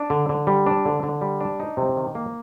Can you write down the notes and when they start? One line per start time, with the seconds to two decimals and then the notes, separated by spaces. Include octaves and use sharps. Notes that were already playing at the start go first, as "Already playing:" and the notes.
Already playing: D4
0.10 D3
0.29 D3
0.47 G3
0.67 D4
0.85 D3
1.03 D3
1.21 G3
1.41 D4
1.60 D#4
1.77 C3
1.97 D#3
2.15 A#3